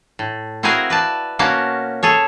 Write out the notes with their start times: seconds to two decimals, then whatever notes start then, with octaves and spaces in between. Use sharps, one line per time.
0.19 A2
0.63 C4 E4 F#4 G#4 A#4 F5
0.90 B4 D5 A5
1.39 B2 A#3 C#4 F#4 F5 A5
2.03 G#4 A4 C#5